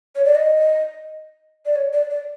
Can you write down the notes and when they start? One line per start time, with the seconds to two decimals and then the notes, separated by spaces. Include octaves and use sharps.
0.16 C#5
0.25 D5
0.35 D#5
1.66 D5
1.75 C#5
1.93 D5
2.10 D5